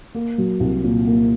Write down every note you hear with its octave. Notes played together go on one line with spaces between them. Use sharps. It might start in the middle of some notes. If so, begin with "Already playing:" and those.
A#3
F#3
C2
A#2
A#3